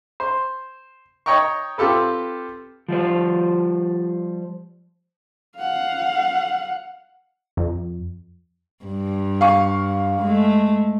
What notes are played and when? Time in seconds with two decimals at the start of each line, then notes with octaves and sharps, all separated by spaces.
0.20 C5
1.26 C#5 D#5 G5 A#5 C#6
1.78 C4 F4 G4 A4 B4
2.88 F3 G3 C5
5.59 F5 F#5
7.57 F2
8.85 G2
9.41 F5 C#6
10.22 G#3 A3